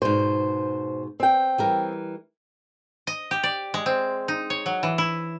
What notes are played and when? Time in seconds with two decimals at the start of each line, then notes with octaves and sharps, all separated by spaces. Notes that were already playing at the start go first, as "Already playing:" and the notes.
0.02 G#2 B2 C5
1.20 C4 G5
1.58 E3 G3 A#4
3.07 D#5
3.31 G4
3.43 D5
3.74 G#3
3.86 C4
4.28 D#4
4.50 C#5
4.66 F#3
4.83 E3
4.98 E4